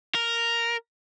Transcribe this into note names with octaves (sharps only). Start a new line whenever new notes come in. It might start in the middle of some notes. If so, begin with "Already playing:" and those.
A#4